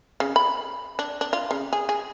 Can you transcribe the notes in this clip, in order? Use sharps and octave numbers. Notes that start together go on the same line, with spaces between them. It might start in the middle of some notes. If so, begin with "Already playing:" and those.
C#3
B5
D4
D4
F4
C#3
G#4
G#4